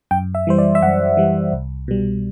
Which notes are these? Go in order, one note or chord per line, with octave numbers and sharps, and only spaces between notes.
F#2 G5
E5
E3 G3 C5
D5
E5
F#2 F#5
E3 G3
C2
B2 G3